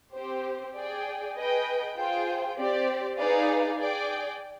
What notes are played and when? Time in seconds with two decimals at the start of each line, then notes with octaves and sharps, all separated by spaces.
0.14 C4 G4 C5
0.75 G#4 D5 G5
1.36 G#4 B4 D#5 G5
1.96 F4 G#4 C5 G5
2.57 C4 G4 D5
3.17 D#4 G#4 B4 D5 F5
3.78 G#4 D5 G5